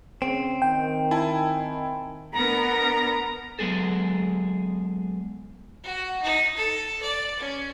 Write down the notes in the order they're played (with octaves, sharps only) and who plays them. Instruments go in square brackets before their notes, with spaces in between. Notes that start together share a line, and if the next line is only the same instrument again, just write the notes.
[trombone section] C#3 [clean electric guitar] C4
[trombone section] D#3 [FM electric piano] G5
[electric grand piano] E4 G#5 A5
[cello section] B3 D4 A#4 [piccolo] A#5
[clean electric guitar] F#3 G#3 B3 G#4 A4
[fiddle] F#4
D#4
A4
D5
C#4